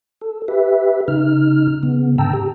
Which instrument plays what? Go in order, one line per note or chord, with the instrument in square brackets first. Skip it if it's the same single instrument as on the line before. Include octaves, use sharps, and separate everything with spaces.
[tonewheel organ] A4
G4 B4 E5
C#3 D#4 F6
C#3 B3
G#2 D3 G5 A5 A#5 E6
G4